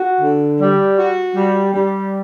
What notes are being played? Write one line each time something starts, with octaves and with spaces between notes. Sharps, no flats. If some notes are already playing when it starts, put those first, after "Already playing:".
Already playing: F#4
D3
G3
F#4
G3
G3